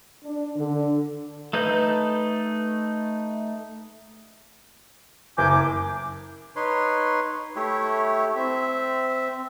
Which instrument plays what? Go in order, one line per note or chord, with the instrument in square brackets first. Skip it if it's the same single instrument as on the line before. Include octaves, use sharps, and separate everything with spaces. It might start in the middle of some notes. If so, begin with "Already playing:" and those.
[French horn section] D4
D3
[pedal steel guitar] A3 D#4 B4 G6
[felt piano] F#1 [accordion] G#5 D6 G6
[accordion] D6
[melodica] D#4 B4 C#5 C6
A3 E4 G4 C#5
C4 E5